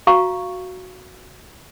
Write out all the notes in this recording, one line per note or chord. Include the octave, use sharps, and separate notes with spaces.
F#4 F5 A#5 C#6